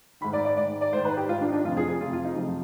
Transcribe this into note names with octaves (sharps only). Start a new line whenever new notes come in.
G#2 D#3 B5
D5
D5
G#2 D#3 D5
D5
G#2 D#3 C5
B4
G4
G#2 D#3 F4
D4
D#4
D4
F2 C3 F3 F4
G#4
G#4
F2 C3 F3 F4
F4
D#4
F2 C3 F3